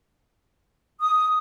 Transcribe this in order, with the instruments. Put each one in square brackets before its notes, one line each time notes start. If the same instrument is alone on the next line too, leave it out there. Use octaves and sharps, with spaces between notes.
[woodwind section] D#6